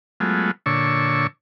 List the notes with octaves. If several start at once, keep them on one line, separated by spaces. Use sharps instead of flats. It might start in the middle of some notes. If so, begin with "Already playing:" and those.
F#3 G#3 A3 B3 F4
A#2 D3 D4 C#5 C#6 E6